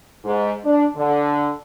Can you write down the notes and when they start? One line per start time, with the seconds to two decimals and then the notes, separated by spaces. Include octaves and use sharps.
0.25 G#2
0.64 D4
0.96 D3